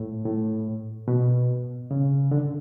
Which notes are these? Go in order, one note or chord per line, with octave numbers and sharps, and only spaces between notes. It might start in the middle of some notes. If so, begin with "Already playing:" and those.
Already playing: A2
A2
B2
C#3
D3